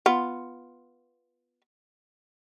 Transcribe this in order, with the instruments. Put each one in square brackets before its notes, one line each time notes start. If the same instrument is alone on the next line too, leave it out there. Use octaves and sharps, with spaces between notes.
[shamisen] B3 F4